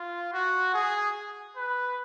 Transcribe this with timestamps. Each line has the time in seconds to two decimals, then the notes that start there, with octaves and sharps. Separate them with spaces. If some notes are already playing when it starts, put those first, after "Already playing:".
Already playing: F4
0.33 F#4
0.74 G#4
1.56 B4